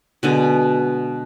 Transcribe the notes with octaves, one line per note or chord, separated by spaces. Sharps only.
B2 D3 G#3